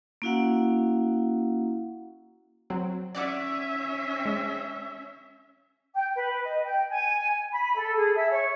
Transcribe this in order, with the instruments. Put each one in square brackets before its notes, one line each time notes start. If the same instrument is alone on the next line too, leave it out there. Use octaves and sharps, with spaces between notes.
[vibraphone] A#3 C#4 E4 F#4 F5 F#5
[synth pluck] F#3 C4
[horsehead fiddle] C#4 E5 [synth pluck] D5 F#5 D6
[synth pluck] G#3
[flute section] G5
B4
D#5
G5
G#5
B5
A4
G#4
E5
C#5